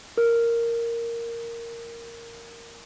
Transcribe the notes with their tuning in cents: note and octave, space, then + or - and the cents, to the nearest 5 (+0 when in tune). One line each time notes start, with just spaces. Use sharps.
A#4 -5